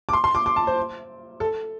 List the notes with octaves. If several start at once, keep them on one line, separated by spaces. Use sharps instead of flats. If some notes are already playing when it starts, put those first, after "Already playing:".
D6
C6
C6
D6
D6
A5
C5
A4